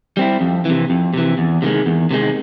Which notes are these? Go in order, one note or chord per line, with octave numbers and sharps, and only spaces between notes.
G3 C4 E4
F2
C3 E3
F2
C3 E3
E2
C3 D#3 G#3
E2
C3 D#3 G#3